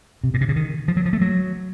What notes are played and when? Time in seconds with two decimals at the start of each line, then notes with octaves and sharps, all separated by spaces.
0.24 C3
0.34 A#2
0.41 C3
0.49 C#3
0.56 D#3
0.88 F3
0.97 F#3
1.06 F3
1.13 A3
1.21 F#3